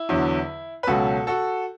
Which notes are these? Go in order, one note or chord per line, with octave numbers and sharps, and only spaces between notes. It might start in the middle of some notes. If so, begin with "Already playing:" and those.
Already playing: E4
E2 D3 F#3
B4
C#2 B2 F#3 F#4 A4
F#4 A4